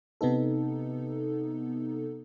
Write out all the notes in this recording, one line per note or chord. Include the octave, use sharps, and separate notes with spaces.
C3 B3 D#4 A4